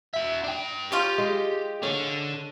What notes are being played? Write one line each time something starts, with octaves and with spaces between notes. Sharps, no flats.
F#4 E5
D4 G5
F#3 G3 F4 G4
G#3
D3 C#4